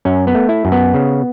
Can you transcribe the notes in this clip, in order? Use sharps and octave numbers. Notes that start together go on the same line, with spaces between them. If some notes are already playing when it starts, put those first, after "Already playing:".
F#2 C#4
B3
A3
E4
F#2
B3
C#3